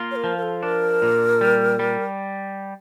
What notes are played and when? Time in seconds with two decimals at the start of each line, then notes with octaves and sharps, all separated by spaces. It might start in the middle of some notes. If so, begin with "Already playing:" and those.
Already playing: A#3 F4
0.11 C#5
0.16 A#4
0.24 F3
0.38 A#4
0.42 A4
0.63 D4 A#4
1.02 A#2
1.41 G3
1.79 G3